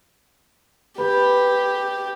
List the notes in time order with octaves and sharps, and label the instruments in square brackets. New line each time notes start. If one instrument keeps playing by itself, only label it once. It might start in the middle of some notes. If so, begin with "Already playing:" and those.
[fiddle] G4 [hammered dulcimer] B4